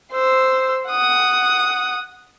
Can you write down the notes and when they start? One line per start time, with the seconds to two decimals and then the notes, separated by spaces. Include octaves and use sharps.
0.12 C5 E6
0.87 F#5 D#6